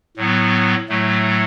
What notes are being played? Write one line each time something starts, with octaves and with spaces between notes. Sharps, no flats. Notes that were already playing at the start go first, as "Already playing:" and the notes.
A2 F#3 B3
A2 F#3 A3